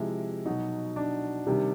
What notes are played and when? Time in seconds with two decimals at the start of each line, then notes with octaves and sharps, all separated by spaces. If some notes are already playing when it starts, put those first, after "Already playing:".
Already playing: C3 F3 G#3 E4
0.45 B2 F#3 D#4
0.96 D4
1.47 C3 D#3 G3